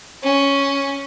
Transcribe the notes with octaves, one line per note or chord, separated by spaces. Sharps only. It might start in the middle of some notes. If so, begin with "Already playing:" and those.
C#4